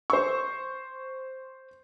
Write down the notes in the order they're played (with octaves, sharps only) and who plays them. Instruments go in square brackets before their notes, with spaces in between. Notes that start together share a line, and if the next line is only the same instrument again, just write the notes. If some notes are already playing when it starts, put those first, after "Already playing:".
[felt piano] C5 C#6